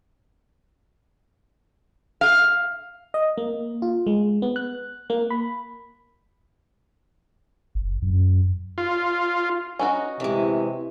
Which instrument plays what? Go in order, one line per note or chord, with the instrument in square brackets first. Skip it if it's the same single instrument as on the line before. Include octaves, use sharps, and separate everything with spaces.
[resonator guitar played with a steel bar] F5
[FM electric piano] D#5
A#3
F4
G#3
B3
F#6
A#3
B5
[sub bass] F#1
F#2
[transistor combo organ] F4
[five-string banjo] C#4 D#4 F#4
[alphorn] C3 [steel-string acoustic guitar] E3 G#3